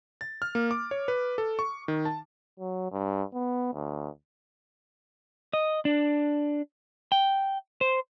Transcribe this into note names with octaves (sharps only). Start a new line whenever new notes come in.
A6
F6
A#3
D6
C#5
B4
A4
C#6
D#3
A5
F#3
G2
B3
D2
D#5
D4
G5
C5